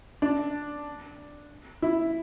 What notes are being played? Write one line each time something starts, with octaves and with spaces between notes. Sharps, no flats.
D4
E4